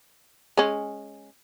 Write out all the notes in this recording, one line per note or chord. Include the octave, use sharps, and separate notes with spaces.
G#3 C#4